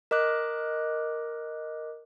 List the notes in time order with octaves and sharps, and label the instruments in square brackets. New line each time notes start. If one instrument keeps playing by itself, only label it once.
[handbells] A#4 D#5 D6 F#6